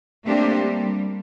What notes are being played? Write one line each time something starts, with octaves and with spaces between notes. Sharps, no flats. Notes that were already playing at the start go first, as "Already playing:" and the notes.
A3 A#3 C4 D4 G4
G3